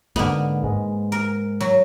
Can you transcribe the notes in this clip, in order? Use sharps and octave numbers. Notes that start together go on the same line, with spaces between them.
G#2 D3 A#3 B3
G#2 G#3
A#4
F#3